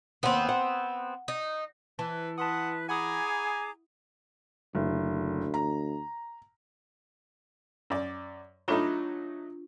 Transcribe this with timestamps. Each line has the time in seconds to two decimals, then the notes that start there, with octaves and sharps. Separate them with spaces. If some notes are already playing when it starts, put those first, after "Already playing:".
0.23 D#2 B3 C4 F#5
0.49 F#5
1.28 D#4
1.99 E3 B4 A5
2.38 B4 F#5 A5 C6 D#6
2.89 G#4 F#5 G#5 A#5 B5 D6 D#6
4.75 F#1 D2
5.54 A#5
7.90 F#2 D5
8.68 F#3 A3 D4 D#4 F4 B5